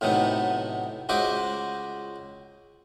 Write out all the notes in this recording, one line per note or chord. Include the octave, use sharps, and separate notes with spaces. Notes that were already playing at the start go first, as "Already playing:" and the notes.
A2 C3 F#3 A3 B3 D#4
C#2 F#4 C5 D#5 E5 D6